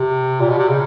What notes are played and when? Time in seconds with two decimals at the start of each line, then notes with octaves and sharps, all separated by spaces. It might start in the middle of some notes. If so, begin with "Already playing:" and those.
Already playing: C3
0.40 A#2
0.49 B2
0.58 C3
0.68 C#3